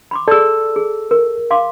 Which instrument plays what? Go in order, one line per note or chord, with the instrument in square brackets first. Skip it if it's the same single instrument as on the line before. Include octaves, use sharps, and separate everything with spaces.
[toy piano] B5 C6 D6
[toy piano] G#4 D5 [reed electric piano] A4 E6
[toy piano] G#4
A#4
F5 C6 D6